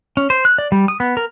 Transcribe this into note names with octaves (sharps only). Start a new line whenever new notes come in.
C#4
C5
F#6
D5
G3
D#6
B3
A#4